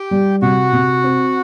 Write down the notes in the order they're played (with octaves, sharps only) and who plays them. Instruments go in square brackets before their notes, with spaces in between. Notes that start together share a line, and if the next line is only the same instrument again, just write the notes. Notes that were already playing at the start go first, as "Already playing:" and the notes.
Already playing: [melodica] G4 G5
[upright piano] G3
[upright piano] C3 [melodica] F#4 F#5
[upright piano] C3
C4